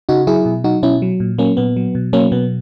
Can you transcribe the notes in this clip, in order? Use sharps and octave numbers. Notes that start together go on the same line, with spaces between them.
C#3 D#4 F#4
F#3 E4 G#4
B2
F#3 D#4 F#4
B2 C#4 E4
F#3
A#2
F#3 A#3 C#4
A#2 B3
F#3
B2
F#3 A#3 C#4
B2 B3